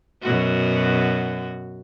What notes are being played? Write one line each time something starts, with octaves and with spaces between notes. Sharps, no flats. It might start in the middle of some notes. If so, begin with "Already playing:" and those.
F#2 B2 F#4